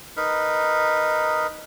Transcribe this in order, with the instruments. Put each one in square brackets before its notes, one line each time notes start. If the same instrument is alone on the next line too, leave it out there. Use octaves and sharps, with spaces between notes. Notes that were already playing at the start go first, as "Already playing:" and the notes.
[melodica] D#4 A#4 B4